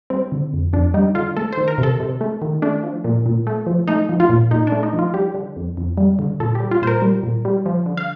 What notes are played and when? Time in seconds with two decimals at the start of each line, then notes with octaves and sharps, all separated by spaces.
0.10 G3 C4
0.32 D3
0.53 F2
0.73 F2 D4
0.94 G3 D#4
1.15 D3 F4
1.37 A3 A4
1.53 D#3 C5
1.68 A#4
1.78 C3
1.83 A4
2.00 C3
2.21 A3
2.42 D#3
2.62 A3 D4
2.83 F3
3.04 A#2
3.26 A#2
3.47 A3
3.67 F3
3.88 A3 D#4
4.09 F3
4.20 F4
4.30 A#2
4.51 A#2 D#4
4.67 D4
4.72 A3
4.83 D#4
4.93 F3
4.99 F4
5.14 G3 G4
5.35 D3
5.56 F2
5.77 F2
5.98 G3
6.19 D3
6.40 A#2 A4
6.55 G4
6.60 G3
6.71 F4
6.82 A#2 C5
6.87 A#4
7.02 G3
7.23 A#2
7.45 G3
7.66 F3
7.86 D3
7.97 F5